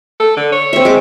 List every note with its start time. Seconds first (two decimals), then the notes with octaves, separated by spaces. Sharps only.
0.20 A4
0.37 D3
0.52 C#5
0.73 C4 E5
0.85 G#3 D6